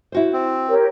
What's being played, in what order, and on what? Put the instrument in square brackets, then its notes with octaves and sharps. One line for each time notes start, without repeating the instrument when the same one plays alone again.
[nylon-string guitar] E4 F#4 C5
[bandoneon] C4
[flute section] G4 A#4 C#5